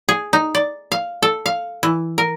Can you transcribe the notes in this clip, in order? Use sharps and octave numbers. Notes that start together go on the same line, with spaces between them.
G#4
D#4
D5
F5
A4
F5
E3
A#4